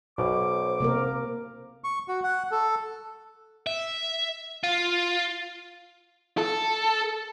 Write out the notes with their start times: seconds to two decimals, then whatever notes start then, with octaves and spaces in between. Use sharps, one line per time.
0.18 B1 B2 C5 D6
0.80 C3 A#3 A#4
1.84 C#6
2.08 F#4
2.24 F#5
2.51 A4
3.67 E5
4.63 F4
6.38 A4